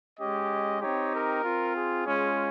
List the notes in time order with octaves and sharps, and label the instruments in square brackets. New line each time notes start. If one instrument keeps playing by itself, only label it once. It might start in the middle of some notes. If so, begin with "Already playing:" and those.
[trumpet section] G#3 C#4 G4 D#5
C4 D#4 G4 C#5
A#4
C4 F4
G#4
G#3 C#4 F4